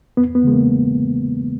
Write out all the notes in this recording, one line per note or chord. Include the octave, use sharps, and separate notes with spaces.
E2 B3
B3
C#3 E3 G#3
A#3